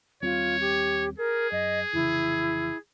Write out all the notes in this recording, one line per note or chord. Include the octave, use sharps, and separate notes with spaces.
D#2 G3 C4 F4 C#5
G4
G#4 A#4
F#2 D#5
F1 C#3 E3 E4